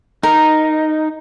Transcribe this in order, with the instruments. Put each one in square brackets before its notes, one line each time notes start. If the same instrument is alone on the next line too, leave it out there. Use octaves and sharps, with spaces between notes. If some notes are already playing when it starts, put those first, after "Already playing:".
[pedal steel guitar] D#4 [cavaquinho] A#4